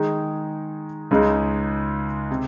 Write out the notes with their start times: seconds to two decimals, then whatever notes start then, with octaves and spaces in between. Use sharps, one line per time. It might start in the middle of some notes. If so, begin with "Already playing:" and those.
Already playing: D#3 G#3 D#4 G#4
1.11 C#2 C#3 G#3 D#4
2.31 C3